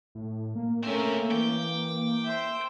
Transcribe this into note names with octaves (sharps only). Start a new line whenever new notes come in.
A2
A#3
A3 C4 C#4 A#4 E5
E3 G5 D6
C5 E5